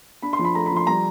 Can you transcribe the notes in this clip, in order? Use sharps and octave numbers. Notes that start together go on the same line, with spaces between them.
D4 B5
C6
F3
B5
A3 A#5
B5
F3
C6
G3 A#5